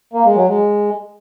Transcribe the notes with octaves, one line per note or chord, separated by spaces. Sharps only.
A#3
G#3
F#3
G#3